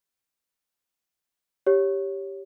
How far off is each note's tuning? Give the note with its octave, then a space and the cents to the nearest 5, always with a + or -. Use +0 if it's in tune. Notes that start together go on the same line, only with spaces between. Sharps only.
G4 +0 C#5 +0